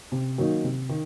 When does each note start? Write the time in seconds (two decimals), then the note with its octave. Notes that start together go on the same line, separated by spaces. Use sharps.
0.12 C3
0.38 D#3 F#3 A#3 D#4
0.64 C3
0.89 D#3